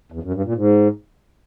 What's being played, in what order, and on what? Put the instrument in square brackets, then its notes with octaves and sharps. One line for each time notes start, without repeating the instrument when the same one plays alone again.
[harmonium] E2
F#2
G2
A#2
G#2